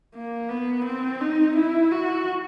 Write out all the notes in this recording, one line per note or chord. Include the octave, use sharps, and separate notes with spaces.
A#3
B3
C4
D#4
E4
F#4